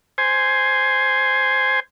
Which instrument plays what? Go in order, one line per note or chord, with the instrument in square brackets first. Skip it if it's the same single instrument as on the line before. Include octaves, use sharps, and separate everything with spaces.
[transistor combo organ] C5 G#5